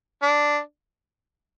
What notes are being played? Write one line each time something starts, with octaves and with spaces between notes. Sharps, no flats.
D4